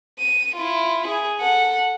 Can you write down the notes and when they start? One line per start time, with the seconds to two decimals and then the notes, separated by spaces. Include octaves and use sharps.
0.19 D#7
0.55 E4 F4
1.07 G#4
1.40 A4 F#5